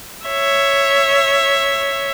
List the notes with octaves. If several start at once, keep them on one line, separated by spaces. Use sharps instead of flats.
C#5 E5